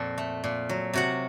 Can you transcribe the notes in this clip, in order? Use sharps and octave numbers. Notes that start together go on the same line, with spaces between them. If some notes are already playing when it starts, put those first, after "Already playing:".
Already playing: F2 A#2 F#4 A4
A3
A#2
F#3
C3 F#4 F#5